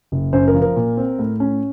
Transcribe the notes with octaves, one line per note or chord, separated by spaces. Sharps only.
F#1
F#2 C5
A#4
F3
A#4
A#2
C4
A2
C#4